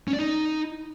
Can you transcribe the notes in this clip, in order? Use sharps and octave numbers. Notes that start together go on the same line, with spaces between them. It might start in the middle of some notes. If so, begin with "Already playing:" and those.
C#4
D5
D#4